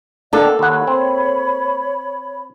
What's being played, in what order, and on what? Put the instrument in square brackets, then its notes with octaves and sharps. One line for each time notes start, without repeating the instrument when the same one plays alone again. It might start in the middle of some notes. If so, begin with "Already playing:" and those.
[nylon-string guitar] A#3 A4 [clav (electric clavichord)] D4 [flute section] D#5 F#5 G5
[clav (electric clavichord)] D#2 F#5 [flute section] C#5 B5
[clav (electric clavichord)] C4